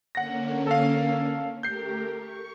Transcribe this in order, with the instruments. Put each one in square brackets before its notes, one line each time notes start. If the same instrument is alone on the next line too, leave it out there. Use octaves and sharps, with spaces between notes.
[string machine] D3 A#3 C#4 [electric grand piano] F#5 A#6
[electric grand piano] A4 F5
[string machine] A3 G4 A#4 [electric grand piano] G6 C7
[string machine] C#6